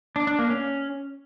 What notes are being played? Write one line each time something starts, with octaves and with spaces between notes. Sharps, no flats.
D4
D4
A#3
C#4